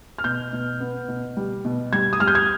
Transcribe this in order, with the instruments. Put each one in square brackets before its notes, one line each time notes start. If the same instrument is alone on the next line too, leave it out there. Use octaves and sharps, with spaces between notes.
[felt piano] F6
B2 G6
B2
B3
B2
G3
B2
G3 G#6
D#6
G3 F6
G6
G#6